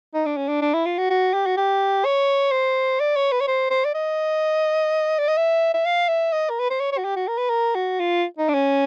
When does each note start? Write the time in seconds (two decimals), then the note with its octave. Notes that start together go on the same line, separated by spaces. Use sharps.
0.14 D#4
0.26 D4
0.37 C#4
0.48 D4
0.62 D4
0.74 E4
0.86 F4
0.98 F#4
1.10 F#4
1.33 G4
1.46 F#4
1.57 G4
2.05 C#5
2.52 C5
3.00 D5
3.16 C#5
3.32 B4
3.41 C#5
3.48 C5
3.70 C5
3.85 D5
3.95 D#5
5.19 D5
5.28 D#5
5.37 E5
5.74 E5
5.86 F5
6.08 E5
6.32 D#5
6.49 A#4
6.59 B4
6.70 C5
6.80 C#5
6.92 C#5
6.98 F#4
7.05 G4
7.16 F#4
7.28 A#4
7.38 B4
7.49 A#4
7.75 F#4
8.00 F4
8.39 D#4
8.49 D4
8.54 C#4